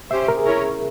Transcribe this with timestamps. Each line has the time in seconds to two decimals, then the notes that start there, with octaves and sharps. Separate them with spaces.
0.11 C#4 G4 C5 E5
0.28 A#4
0.37 G#4
0.46 C#4 E4 A#4 C#5